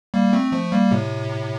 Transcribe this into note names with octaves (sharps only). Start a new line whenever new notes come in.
G3 A#3
A3 C4
F3 A3
G3 A#3
A2 C3